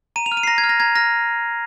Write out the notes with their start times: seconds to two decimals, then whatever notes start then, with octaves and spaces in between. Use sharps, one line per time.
0.16 A#5 D#7
0.26 F7
0.32 F6
0.37 D#7
0.43 C7
0.47 A#5 A#6
0.58 G#6
0.64 F6
0.69 A#6
0.80 A#5 G#6
0.95 F6 A#6